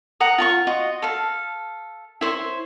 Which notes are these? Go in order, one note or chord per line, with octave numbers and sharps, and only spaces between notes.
F#5 A#5 D#6
F4 A5 C#6
F4 F#4 D#5
A4 F5
E4 C5 C#5